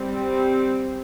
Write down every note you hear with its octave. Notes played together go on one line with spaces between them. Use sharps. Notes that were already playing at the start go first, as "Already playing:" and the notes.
Already playing: G3 C4